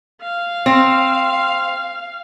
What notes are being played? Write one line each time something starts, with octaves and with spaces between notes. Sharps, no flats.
F5
C4